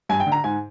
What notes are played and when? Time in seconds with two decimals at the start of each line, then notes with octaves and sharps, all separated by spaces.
0.09 G2 G#5
0.20 G5
0.27 D3
0.32 A#5
0.44 G#2 G#5